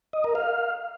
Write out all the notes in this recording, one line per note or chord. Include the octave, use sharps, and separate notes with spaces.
D#5
A#4
F5